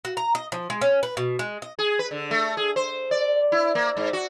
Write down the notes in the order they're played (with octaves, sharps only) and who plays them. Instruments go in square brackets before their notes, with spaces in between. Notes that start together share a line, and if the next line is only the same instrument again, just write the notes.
[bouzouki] F#4
A#5
D#5
F3
G#3
C#4
B4
B2
G#3
D#5
[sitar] G#4
B4
D3
A3
G#4
C5
D5
E4
A#3
G#2
F#4